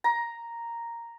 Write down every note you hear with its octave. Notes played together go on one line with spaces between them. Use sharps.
A#5